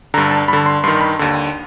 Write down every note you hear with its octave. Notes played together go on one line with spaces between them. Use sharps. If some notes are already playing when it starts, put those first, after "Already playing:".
G2 D3 A#5
A5
G2 D3 B5
C6
G2 D#3 C6
B5
D#2 D3